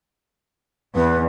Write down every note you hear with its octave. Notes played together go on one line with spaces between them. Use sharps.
E2 B4